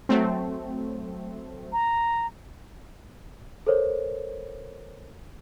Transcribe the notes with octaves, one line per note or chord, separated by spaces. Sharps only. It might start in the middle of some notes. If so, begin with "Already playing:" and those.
F#3 A3 C4
A#5
A4 A#4 C5 C#5